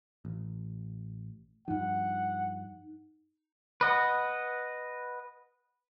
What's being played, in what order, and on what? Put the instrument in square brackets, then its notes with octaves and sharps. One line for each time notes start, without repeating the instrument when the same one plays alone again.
[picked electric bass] A1
[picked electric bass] G2 F3 [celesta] D#4 [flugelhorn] F#5
[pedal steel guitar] B4 D#5 F#5